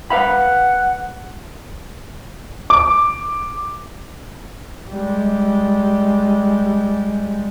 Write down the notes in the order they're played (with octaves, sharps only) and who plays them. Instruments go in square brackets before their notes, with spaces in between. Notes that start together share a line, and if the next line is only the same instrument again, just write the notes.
[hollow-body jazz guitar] B4 F5 B5 [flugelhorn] F#5
[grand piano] D6
[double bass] G3 G#3